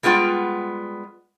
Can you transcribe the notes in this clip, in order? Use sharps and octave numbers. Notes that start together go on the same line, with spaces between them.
G3 G#3 B3 F4 G5